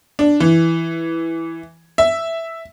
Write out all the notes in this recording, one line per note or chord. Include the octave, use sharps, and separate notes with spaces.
D4
E3
E5